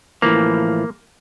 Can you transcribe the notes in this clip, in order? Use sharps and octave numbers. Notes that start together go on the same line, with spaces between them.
A2 E3 F3 A#3